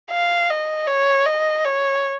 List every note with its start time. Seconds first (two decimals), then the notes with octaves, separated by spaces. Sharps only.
0.11 F5
0.50 D#5
0.87 C#5
1.26 D#5
1.65 C#5